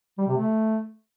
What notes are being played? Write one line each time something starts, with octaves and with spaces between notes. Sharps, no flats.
G3
C3
A3